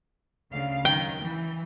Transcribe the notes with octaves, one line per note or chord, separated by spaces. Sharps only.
D2 C#3 F5
D#3 F#3 G5
E3